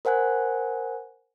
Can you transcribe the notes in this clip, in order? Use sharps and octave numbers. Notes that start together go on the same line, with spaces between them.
A#4 C5 F#5 G#5 F#6